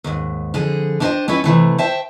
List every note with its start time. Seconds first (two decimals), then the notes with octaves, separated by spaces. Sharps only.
0.04 D#2 G#2
0.54 F2 D3 G#4
1.00 D4 E4 G4 A4 C5 D#5
1.28 B3 C#4 E4 B4
1.44 C3 E3 A3
1.78 C5 E5 G5 A5